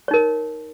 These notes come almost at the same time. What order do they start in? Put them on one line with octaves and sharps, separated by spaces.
C#5 D#4 A#4